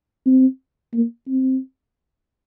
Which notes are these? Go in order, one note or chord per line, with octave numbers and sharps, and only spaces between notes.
C4
A#3
C4